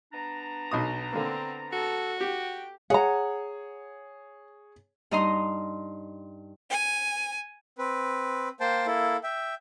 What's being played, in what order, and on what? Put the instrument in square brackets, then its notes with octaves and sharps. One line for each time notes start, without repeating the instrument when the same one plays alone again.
[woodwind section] B3 D4 A#5
[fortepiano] B1 B2 D#6
[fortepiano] D3 A#3 [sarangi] C4
[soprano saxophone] F#4 [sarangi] A4
[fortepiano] G4 [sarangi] G5
[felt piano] G#4 C#5 [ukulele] F#5 A#5
[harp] G2 D#4 D#5 A#5 C6
[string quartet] G#5
[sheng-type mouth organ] C4 B4
A#3 C5 G5 A5
A#3 E4 A4
E5 G5